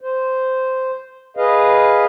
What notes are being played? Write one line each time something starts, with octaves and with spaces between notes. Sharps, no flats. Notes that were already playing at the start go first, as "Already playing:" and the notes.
C5
G#4 B4 D#5 F5